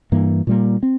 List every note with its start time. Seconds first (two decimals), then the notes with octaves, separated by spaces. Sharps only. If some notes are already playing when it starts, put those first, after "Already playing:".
0.12 G2 E3 A#3
0.47 A#2 G3 A#3
0.83 C4